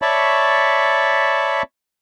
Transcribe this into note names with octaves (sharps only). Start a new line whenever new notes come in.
C#5 D5 E5 A5 B5 C#6